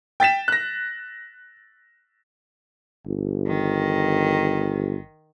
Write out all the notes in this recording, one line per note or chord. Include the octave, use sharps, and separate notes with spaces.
G5 A6 B6 E7
F#6 A#6
G1
D#3